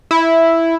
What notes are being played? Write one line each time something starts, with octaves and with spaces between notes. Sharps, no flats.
E4